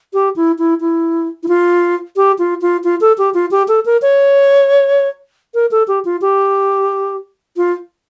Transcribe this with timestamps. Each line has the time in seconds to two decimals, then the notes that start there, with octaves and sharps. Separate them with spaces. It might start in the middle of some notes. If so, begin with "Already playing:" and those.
0.13 G4
0.36 E4
0.59 E4
0.81 E4
1.43 E4
1.48 F4
2.16 G4
2.39 F4
2.62 F4
2.84 F4
3.01 A4
3.18 G4
3.34 F4
3.51 G4
3.68 A4
3.86 A#4
4.02 C#5
5.54 A#4
5.71 A4
5.88 G4
6.05 F4
6.21 G4
7.57 F4